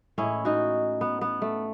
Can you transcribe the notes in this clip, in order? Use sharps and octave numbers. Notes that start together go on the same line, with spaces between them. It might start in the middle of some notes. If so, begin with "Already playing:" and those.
A2 E3 G#3 C#4 E4
D#4 F#4
B3
B3
A3